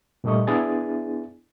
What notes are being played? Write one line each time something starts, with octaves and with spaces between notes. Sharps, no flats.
G2 A#2 G3 A3 D#5 C#6
B3 D4 E4 G#4 A6